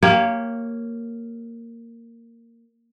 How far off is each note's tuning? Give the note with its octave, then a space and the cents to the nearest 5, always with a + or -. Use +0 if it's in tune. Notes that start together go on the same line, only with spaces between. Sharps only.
A#3 -10 G4 +0 C#5 +0